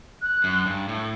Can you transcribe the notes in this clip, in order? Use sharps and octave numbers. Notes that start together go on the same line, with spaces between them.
F#6
F#2
G2
A2